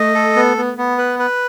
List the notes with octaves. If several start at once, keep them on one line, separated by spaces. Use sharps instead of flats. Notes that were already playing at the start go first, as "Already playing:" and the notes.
Already playing: A3 D#5
A4
B3
B3
B3
B4
B4